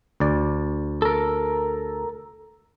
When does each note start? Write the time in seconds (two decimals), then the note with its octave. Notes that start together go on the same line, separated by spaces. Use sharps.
0.20 D2 D5
1.02 A4 A#4